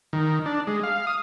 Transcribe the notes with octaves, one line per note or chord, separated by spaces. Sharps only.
D#3
D4
G#3
F5
D#6